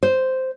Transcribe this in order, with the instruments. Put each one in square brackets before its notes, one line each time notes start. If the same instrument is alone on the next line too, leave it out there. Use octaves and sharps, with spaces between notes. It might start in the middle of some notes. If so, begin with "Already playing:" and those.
[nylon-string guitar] C5